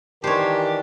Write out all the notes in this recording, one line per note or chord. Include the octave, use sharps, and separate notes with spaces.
D#3 E3 D4 G4 A#4 C5 C#5